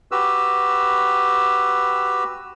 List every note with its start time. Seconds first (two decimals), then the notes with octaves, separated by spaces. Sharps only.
0.11 F#4 G4 B4 E6